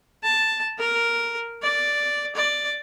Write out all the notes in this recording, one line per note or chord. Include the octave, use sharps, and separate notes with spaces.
A5
A#4
D5
D5